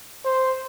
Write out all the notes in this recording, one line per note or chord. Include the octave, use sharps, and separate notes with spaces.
C5